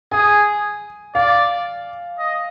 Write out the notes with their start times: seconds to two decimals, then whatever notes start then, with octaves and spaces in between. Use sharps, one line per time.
0.12 G#4 G#5
1.15 D5 F5
2.18 D#5